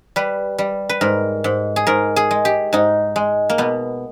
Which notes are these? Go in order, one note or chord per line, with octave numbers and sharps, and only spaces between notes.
G3 B4
G3
B4
G#2 A#4
G#2
G#4
G#2 A#4
G#4
G#3
G4
G#2 D#4
G#3
A#3
B2 B3